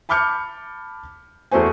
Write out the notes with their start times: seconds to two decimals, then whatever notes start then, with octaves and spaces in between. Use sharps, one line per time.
0.09 A5 B5 D6 F6 G6 C#7
1.51 E2 A3 F#4 C5 G#5